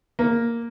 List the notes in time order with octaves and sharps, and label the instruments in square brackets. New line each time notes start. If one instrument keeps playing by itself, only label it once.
[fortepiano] A#3